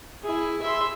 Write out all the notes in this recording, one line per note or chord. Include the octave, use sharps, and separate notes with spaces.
E4 G#4
E5 C6